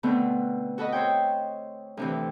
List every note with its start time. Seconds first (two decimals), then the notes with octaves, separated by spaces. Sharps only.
0.03 B2 D3 A3 B3 C4
0.78 F#4 A4 B4 D#5
0.92 A4 C5 C#5 G5
1.97 D2 C3 E3